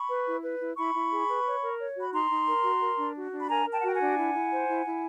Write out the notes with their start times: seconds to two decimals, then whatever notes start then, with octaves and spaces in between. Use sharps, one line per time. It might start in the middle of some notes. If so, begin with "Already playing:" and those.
Already playing: B5 C#6
0.09 B4
0.26 E4
0.44 B4
0.60 E4
0.77 E4 B5 C#6
0.94 E4
1.12 G#4
1.28 B4
1.46 C#5
1.62 A#4
1.79 C#5
1.96 F#4
2.01 B5
2.13 D#4 A#5 C6
2.30 D#4
2.47 A#4
2.64 F#4
2.81 A#4
2.98 D4
3.15 F#4
3.32 D4
3.41 B5
3.49 A#4 G#5 A#5
3.66 A#4
3.72 G5 A5
3.80 F#5
3.83 F#4 G5
3.94 F#5 G#5
4.00 D4
4.17 E4
4.34 E4
4.51 C5
4.68 E4
4.85 E4